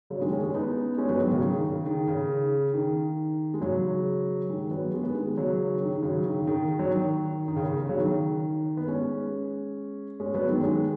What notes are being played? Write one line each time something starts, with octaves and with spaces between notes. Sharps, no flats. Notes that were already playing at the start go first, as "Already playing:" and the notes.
C#3 F#3
D#3 G#3
G#3 C#4
G#3 C#4
B3 D#4
G#3 C#4
F#3 B3
D#3 G#3
C#3 F#3
D#3
D#3
C#3
D#3
C#3
D#3
G#3
C#3 F#3
D#3 G#3
F#3 B3
G#3
B3
D#3 G#3
C#3 F#3
D#3
D#3
C#3 F#3
D#3
C#3
D#3
F#3
D#3
D#3
C#3
C#3
C#3 F#3
D#3
B3
G#3 C#4
G#3 C#4
F#3 B3
D#3 G#3
F#3
D#3 G#3